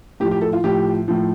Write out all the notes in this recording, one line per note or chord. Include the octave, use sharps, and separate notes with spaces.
A2 F3 G4
G4
A4
F4
A2 F3 G4
A2 F3